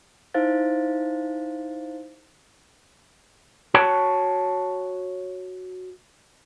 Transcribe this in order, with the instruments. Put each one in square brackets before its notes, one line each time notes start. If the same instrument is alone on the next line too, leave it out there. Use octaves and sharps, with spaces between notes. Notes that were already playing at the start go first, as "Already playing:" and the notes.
[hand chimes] D#4 E4 C5 F5 A6
[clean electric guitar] F#4 C#5 G5 A5